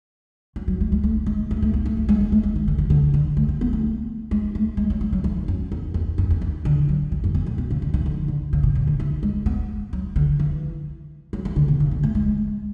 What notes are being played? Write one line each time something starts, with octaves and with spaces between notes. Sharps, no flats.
F#3
F#3
G#3
G#3
A3
G#3
A3
A3
B3
A3
A3
G#3
B3
A3
G#3
E3
D3
E3
D3
D3
A3
B3
B3
A3
G#3
A3
G#3
F#3
F#3
F#3
E3
F#2
E2
E2
F#2
E2
E2
D3
F#3
E3
F#2
E2
A2
B2
C#3
D3
E3
D3
D3
C#3
B2
C#3
D3
E3
G#3
B3
F#3
D3
E3
F#3
E3
D3
B2
C#3
B3
A3
G#3